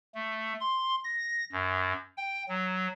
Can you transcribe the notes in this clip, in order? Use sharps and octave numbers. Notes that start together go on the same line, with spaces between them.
A3
C6
A#6
F#2
G5
F#3